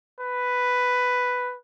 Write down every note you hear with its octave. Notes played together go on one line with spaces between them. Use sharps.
B4